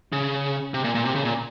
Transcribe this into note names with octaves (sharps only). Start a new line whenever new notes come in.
C#3
C3
A#2
A#2
C3
C#3
A#2